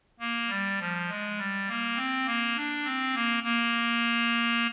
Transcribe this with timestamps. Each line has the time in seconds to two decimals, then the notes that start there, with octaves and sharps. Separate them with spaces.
0.20 A#3
0.49 G3
0.79 F3
1.09 G#3
1.38 G3
1.68 A#3
1.96 C4
2.26 A#3
2.56 D4
2.84 C4
3.15 A#3
3.43 A#3